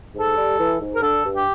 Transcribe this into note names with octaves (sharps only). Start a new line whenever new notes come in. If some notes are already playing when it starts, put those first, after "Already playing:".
G#2
A4
G3
E3
G#2
A#4
D3 A4
G2
G4